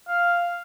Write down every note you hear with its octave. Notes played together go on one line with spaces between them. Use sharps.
F5